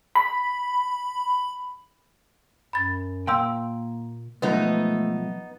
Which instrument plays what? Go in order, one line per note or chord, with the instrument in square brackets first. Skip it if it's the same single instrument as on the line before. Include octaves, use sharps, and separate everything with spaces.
[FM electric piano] B5
[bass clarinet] F#2 [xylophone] B5 A6
[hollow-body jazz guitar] A#2 G5 [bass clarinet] A#3 [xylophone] F5 C6 E6
[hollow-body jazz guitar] B1 G#2 F3 [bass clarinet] A3 [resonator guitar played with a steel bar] B3 D#4